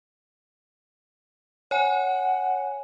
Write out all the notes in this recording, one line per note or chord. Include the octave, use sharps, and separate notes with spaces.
C#5 F#5 G#5